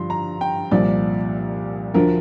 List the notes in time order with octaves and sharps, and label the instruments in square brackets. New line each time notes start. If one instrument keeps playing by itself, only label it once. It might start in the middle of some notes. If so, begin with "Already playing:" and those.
Already playing: [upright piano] G2 D3 F3 C6
A#5
G5
C2 A#2 F3 D5
D2 D3 F3 A#4